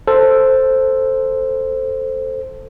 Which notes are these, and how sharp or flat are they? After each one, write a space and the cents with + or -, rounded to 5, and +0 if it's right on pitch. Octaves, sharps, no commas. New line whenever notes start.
A4 +5 C5 +0